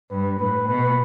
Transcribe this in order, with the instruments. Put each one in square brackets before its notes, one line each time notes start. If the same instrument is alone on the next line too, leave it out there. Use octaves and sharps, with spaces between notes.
[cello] G2 [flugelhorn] B4
[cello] A2 [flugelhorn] B4
[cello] B2 [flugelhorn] B4